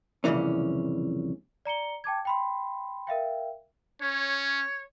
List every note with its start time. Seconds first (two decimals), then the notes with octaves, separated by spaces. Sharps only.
0.24 C2 F2 A#2 C#3 E3 C#4
1.65 D5 A#5 C#7 G7
2.04 G5 A5 D6 G#6
2.25 G5 B5 C6
3.07 A#4 E5 F5 G5
4.01 C#4 C#5